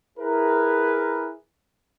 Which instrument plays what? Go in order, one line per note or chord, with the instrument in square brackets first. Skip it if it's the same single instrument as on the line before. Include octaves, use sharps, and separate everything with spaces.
[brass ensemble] E4 G#4 A#4 B4